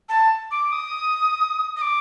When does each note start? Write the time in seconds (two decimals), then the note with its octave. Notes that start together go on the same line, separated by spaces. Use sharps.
0.09 A5
0.51 D6
0.72 D#6
1.77 D#6
1.81 D6